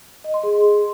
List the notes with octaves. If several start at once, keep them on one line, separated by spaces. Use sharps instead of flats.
D#5
C6
G#4